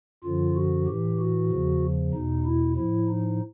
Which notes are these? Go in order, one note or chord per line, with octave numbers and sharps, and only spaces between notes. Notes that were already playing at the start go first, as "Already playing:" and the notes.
F#2 D3 F3 F4
F#4
A2 E3 G4
F#4
E2 C#3 F3
E2 B2 D#4
E4
A2 F3 E4
D#4